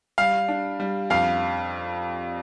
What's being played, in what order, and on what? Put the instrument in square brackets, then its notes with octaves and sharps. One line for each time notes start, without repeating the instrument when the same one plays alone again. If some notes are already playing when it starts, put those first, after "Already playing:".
[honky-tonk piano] G3 [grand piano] F5
[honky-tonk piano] D4
G3
[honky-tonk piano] F2 [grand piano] F5